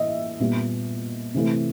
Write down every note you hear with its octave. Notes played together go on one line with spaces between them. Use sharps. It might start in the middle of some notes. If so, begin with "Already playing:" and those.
Already playing: A2 E3 D#5 E5
A#2 G3 B3
C3 E3 A3